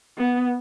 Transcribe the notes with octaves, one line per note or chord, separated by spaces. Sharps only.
B3